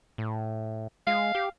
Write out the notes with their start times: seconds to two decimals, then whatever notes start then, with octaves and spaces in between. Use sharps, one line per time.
0.18 A2
1.07 G#3 F5
1.35 G4